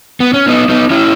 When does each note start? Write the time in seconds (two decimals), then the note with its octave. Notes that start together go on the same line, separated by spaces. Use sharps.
0.20 B3
0.34 C#4
0.48 B3 D#4
0.69 B3 D#4
0.90 C#4 E4